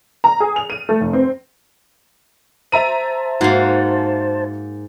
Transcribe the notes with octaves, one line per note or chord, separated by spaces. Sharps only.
A#5
G#4
F7
D#7
A3
F1
C4
C5 E5 A5 A#5 D#7
G#2 A#3 F#4